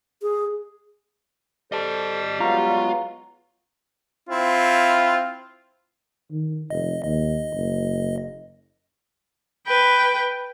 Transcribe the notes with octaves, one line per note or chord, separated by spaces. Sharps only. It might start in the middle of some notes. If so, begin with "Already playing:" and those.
G#4
G3 A4 C5 D#5 A5
F#3 G#3 B3 F4 F5 A#5 C#6
C4 E4 F4
D#3
F1 D#5
D#2 D#5
F#1
B4 G5